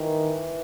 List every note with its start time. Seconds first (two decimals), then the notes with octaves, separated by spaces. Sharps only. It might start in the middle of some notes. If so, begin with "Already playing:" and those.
Already playing: D#3 E3